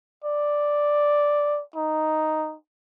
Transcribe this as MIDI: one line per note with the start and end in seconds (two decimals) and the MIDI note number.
0.24 1.62 74
1.76 2.55 63